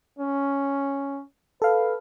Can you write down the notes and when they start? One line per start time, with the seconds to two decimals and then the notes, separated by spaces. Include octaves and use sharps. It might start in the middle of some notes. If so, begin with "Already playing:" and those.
0.19 C#4
1.62 A4 B4 F5